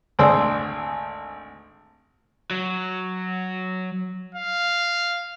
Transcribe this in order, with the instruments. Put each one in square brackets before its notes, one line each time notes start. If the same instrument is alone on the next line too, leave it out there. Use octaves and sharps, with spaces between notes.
[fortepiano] G#1 D2 G#4 C5 D5 E6
[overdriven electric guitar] F#3
[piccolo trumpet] F5